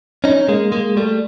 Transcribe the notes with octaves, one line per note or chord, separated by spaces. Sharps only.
C#4 D#4
G#3 A#3
G#3 A#3
G3 A3